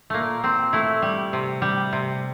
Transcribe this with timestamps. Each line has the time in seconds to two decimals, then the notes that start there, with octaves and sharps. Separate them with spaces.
0.10 A#2 A3 A#3
0.43 A#2 C4
0.73 A3 E4
1.02 G3
1.33 C3
1.62 G3
1.93 C3